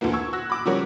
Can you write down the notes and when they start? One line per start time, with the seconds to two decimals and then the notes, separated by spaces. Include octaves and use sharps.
0.01 D2 A#2 D3 E3 A#3
0.13 C#6 E6 G#6
0.33 F#4 E6 F#6 A#6
0.50 B5 D6 F#6
0.65 C#3 F3 G3 F#4 A#4 C#5